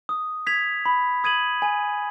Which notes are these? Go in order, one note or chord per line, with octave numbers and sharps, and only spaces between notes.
D#6
G#6 B6 F7
B5
D#6 G#6 D#7 F#7
G#5